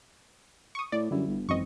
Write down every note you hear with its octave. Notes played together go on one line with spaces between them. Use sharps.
C#6 D#6
A2 D5
F#2 D3 G3 E4
G1
G#1 F#2 E3 C4 D#5 C#6